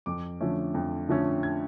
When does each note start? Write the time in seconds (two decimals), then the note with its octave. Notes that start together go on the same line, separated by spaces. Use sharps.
0.06 F2 D6
0.41 D3 F3 A3 C#4
0.74 F2
1.09 D3 F3 A3 C#4
1.43 G#6